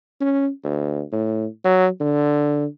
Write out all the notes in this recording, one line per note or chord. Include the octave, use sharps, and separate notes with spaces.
C#4
D2
A2
F#3
D3